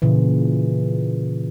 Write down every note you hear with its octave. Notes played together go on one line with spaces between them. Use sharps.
A#2 C#3 E3